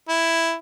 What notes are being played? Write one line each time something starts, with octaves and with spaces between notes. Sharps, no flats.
E4